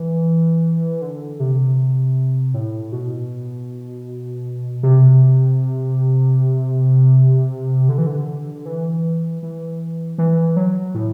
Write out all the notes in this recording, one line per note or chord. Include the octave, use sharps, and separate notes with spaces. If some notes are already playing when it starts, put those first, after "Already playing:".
Already playing: E3
D3
C3
A2
B2
C3
D3
E3
D3
E3
E3
E3
F#3
A2